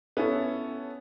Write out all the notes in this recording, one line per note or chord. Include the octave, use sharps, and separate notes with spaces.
B3 C#4 E4 A4